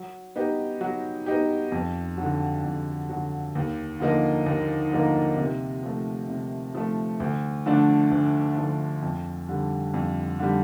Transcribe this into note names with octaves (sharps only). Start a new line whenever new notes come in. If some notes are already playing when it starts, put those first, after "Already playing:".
Already playing: F#3
B3 D#4 G4
F#3
B3 D#4 G4
F2
D3 F#3
F2
D3 F#3
D#2
D3 F3 A#3 D#4
D#2
D3 F3 A#3 D#4
C3
F3 A3
C3
F3 A3
D2
D3 F3 A3 D4
D2
D3 F3 A3 D4
F2
D3 G3
F2
D3 G3